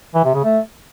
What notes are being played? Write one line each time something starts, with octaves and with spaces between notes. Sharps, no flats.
E3
C3
C#3
A3